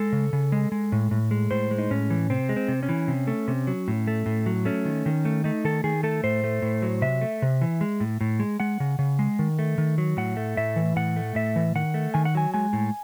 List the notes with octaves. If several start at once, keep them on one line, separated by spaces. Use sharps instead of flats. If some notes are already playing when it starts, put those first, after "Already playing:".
Already playing: G#3 A4
C#3
C#3
G#3
G#3
A2
A2
G#3
A2 C5
G#3
D#4
A2 C#4
E3
C3 C4
G#3
C4
C3
C#4
E3
C3
A3
C3
F#3
A2
A3
A2
F#3
A3 C#4
D#3
D#3
A3
A3 D#4
D#3 A4
D#3 G#4
A3 A4
A2 C5
A3
A2
F#3
C3 E5
A3
C3
E3
G#3
A2
A2
G#3
G#3 F#5
C#3
C#3
G#3
D#3
A3
D#3
F#3
A2 F#5
A3
A2 E5
E3
A2 F#5
A3
A2 E5
E3
D#3 F#5
A3
D#3 G#5
F#5
F#3 G#5
G#3 G#5
A2